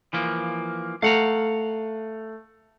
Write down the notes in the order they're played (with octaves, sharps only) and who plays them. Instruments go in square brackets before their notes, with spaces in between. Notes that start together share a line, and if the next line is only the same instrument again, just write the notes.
[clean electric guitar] E3 F3 A#3
[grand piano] A3 [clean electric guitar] F5 F#5 A#5